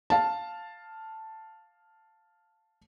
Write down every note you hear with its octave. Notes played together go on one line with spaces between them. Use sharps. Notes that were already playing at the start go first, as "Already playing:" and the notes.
F5 A5